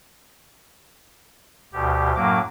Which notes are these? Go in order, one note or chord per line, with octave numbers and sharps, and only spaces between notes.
D2 B2 G4
F#2 A2 F#3 A#3 D6